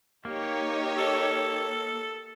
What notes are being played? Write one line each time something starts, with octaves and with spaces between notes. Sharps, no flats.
A#3 D#4 G4 C#5
A4